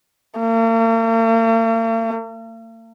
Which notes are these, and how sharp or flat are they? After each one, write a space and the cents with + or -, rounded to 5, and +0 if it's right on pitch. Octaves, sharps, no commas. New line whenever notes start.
A#3 -45